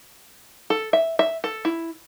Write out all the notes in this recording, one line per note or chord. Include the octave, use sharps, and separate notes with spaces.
A4
E5
E5
A4
E4